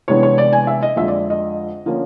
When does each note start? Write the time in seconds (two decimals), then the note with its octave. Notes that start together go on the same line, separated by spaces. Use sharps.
0.08 C3 E3 G#3 B3 D4 C#5
0.23 C#5
0.38 D5
0.53 G#5
0.67 E5
0.83 D#5
0.96 F2 D3 F3 G#3 E5
1.08 D5
1.30 D#5
1.86 D3 F3 A#3 C#4